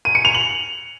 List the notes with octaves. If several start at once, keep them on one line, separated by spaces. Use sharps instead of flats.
D#7
C#7
F7
F#7